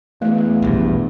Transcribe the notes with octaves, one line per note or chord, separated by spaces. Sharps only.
E2 A3
E1 A#1 G2